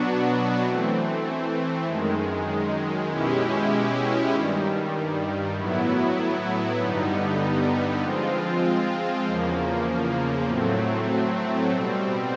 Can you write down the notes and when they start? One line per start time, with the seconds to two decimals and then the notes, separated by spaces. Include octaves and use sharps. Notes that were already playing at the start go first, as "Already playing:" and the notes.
Already playing: B2 F#3 B3 D4 F#4
0.62 E3 A3 C4
1.85 F#2 D#3 G#3
3.08 B2 G#3 C#4 E4 G4
4.31 G2 D#3 G3
5.55 A2 F#3 B3 E4
6.78 G2 D3 G3 B3 D#4
8.01 F3 G#3 C4 F4
9.25 E2 C#3 F3 A#3
10.47 A2 F#3 A3 C4
11.71 B2 G3 C4